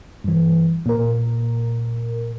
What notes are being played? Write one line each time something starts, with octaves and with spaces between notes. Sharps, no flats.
G2 E3
A#2 A#4